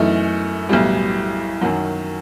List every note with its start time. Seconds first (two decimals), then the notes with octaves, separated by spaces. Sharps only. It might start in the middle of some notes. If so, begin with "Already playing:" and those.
Already playing: F#2 E3 A3 D#4
0.69 B1 A2 E3 G3
1.61 F#2 D#3 F#3